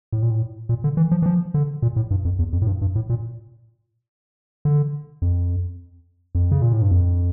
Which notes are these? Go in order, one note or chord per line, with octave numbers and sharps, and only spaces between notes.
A2
A#2
A2
A#2
D3
E3
F3
E3
F3
D3
A#2
A2
G2
F2
E2
F2
A2
G2
G2
A2
A#2
D3
F2
F2
C#3
A#2
A2
G2
F2